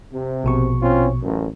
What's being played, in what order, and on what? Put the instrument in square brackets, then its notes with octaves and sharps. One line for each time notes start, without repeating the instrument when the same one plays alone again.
[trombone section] C3
[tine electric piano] A#1 B2 C#6
[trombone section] C4 C#4 F4
A1 F#2